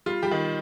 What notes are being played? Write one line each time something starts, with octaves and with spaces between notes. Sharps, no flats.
G3 F4
G3 G4
D#3